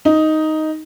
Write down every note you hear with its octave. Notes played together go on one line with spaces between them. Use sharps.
D#4